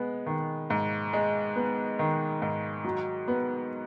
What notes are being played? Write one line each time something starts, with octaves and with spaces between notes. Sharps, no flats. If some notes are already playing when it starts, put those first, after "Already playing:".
Already playing: G#3 B3
D#3
G#2
G#3
B3
D#3
G#2
F#3
B3